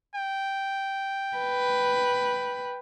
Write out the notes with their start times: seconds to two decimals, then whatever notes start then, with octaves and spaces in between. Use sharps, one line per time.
0.15 G5
1.37 B4